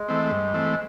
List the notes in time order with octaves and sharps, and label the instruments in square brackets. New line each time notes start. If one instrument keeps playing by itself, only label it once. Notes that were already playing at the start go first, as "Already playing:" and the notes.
Already playing: [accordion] G#3
[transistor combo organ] E3 A3 C4
G2
E3 A3 C4